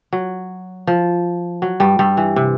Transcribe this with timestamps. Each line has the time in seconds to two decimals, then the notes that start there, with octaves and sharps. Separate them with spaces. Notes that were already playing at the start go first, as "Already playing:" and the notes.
0.13 F#3
0.87 F3
1.62 F#3
1.80 G2 G3
1.99 G2 G3
2.17 E3
2.36 C3